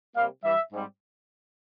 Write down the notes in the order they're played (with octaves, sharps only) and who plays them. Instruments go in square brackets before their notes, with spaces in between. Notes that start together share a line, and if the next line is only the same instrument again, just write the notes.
[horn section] C3 G3 A#3 F5
G2 E3 G3 E5
G#2 G3 C4